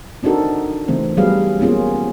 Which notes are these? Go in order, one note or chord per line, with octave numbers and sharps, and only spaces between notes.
C4 D4 D#4 F#4 A4 A#4
C#3 E3 A3 C4
F#3 G3 B3 G#4 B4 F5
A#3 B3 C#4 F4 G#4